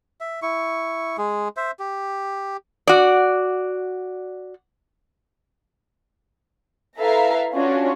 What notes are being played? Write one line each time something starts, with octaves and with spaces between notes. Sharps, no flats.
E5
E4 C#6
G#3 G#4
C5 E5
G4
F#4 D5
E4 A4 B4 E5 F5 A#5
C#4 D4 F4 F#4 C#5